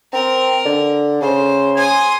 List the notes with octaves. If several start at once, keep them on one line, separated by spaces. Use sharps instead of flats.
C4 A#4
D3
C#3 C5
G#5 C6 D#6